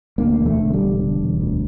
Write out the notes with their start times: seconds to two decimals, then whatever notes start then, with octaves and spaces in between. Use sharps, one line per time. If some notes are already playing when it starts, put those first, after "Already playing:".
0.18 D2 A#3
0.39 E1
0.46 A3
0.59 D3
0.73 G3
0.80 E1
1.00 D3
1.21 E1
1.41 D2